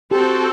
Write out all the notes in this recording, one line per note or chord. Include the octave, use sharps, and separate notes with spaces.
C4 F#4 G4 A4 C5